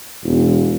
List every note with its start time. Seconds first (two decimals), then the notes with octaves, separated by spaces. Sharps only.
0.23 E1